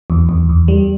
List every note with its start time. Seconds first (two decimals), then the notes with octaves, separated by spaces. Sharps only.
0.10 E2
0.29 E2
0.49 E2
0.68 G3